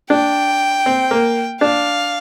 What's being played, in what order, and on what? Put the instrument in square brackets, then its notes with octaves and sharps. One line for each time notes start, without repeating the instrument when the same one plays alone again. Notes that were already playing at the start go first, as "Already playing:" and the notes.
[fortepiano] D4 [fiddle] G5
[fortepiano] C4
A#3
[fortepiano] D4 [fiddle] F5